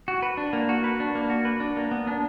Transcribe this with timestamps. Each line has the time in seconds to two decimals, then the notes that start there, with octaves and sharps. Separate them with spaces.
0.08 F#4
0.22 B4
0.37 D4
0.53 A#3
0.69 F#4
0.84 B4
1.00 D4
1.15 A#3
1.30 F#4
1.45 B4
1.60 D4
1.77 A#3
1.91 B3
2.07 D4